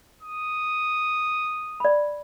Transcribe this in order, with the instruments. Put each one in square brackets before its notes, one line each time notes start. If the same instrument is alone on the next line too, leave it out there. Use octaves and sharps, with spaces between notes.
[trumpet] D#6
[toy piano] D5 B5